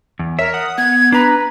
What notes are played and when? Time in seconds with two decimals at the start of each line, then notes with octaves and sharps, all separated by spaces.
0.19 E2
0.39 A#4 C#5 E5
0.54 F#5 D#6
0.78 B3 G#6
1.12 D4 B4 A#5